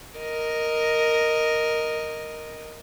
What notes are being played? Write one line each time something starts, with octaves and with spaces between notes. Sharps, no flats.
A#4 D#5